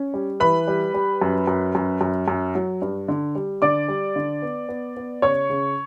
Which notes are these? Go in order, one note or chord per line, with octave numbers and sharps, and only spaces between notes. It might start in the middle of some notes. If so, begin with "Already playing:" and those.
Already playing: C#4
G3
E3 B4 B5
G3
G3
F#2
F#2
F#2
F#2
F#2
F#3
G2
D3
G3
D3 D5 D6
G3
D3
B3
B3
B3
C#3 C#5 C#6
C#3